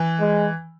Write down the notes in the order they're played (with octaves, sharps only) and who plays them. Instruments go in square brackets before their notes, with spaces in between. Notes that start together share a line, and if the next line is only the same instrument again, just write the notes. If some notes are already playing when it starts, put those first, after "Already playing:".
Already playing: [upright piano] E3
[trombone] G#3